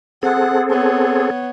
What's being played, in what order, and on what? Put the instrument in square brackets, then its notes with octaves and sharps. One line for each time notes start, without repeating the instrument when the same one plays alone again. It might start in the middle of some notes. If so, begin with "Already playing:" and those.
[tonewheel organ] C4 G#4 A4 [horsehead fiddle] F#5
[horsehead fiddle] B3 C#5